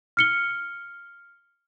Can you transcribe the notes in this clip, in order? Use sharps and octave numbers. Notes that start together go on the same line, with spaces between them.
F6 C#7 G7